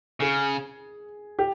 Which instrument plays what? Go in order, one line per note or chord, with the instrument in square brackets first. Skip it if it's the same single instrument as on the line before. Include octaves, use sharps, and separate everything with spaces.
[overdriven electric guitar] C#3 [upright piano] G#4
[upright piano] G4